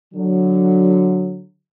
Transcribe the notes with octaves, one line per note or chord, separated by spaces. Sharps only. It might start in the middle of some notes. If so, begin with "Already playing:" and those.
D3 F#3